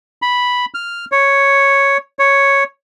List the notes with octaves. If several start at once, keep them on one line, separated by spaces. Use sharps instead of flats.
B5
F6
C#5
C#5